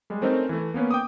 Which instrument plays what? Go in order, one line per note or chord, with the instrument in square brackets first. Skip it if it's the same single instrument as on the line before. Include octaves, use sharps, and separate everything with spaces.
[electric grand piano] G3 G#3
A3 C4 C#4 D#4 A#4
E3 A3
A#3 B3 C#4 B4
G5 D6 D#6